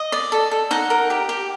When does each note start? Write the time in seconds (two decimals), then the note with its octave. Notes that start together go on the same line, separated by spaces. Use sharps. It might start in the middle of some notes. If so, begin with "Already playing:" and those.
Already playing: D#5
0.12 D5
0.32 A4
0.51 A4
0.71 D#4 F#5
0.90 A#4
1.10 G4
1.29 G4